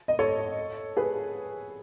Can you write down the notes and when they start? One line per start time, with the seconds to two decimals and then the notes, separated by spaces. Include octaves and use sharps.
0.08 D#5
0.19 A4 C#5
0.97 G#4 B4